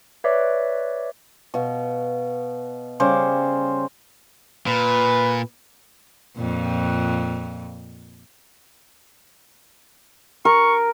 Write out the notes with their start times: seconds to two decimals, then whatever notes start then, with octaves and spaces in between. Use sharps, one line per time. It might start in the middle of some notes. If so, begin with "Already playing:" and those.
0.24 B4 C#5 D5 E5 D6 C7
1.54 B2 F5
3.00 C#3 G3 C5 D6
4.67 A#2 B4
6.37 F2 A#2
10.45 A#4 C#6